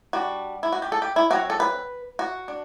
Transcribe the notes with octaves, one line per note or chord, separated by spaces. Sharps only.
G3 D4 F#4
E4
F#4
G4
A4
G4
E4
F#3 C4 F#4
A4
B4
F#4
D4